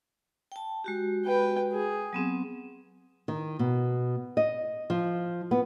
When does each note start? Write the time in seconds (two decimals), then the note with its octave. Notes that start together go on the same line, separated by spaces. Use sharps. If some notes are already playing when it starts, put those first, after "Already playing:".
0.52 G5 A5
0.84 G#3 F#4 G4
1.25 B4 G5
1.72 G#4
2.13 F#3 B3 C4
3.28 D#3
3.59 B2
4.37 D#5
4.90 F3
5.51 B3